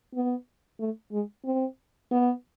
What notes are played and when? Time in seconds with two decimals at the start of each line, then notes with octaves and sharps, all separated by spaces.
0.14 B3
0.80 A3
1.12 G#3
1.45 C4
2.11 B3